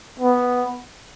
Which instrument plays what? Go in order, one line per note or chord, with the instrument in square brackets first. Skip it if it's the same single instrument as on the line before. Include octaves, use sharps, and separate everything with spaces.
[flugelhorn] B3